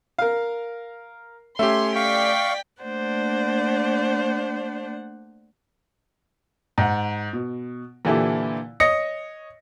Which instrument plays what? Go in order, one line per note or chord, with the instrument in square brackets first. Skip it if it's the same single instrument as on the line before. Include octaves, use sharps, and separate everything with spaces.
[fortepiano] A#4 F5
[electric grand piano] A3 C#4 G4 [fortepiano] E5 [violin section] G#5 C6
[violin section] D5 G5 B6 [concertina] F5 C#6
[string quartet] A3 A#3 D4 C5 D5 F#5
[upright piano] G#2 F#5
B2
A#2 D3 E3 E4 G4 A4
C#5 D#5 D#6 A#6 C#7